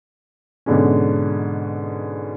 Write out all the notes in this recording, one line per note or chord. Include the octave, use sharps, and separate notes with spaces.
G#2 B2 D3 G#3 C#4